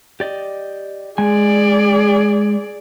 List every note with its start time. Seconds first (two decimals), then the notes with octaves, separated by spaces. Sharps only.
0.20 G4 D5 D#5
1.18 G#3 G#4 D5 G#5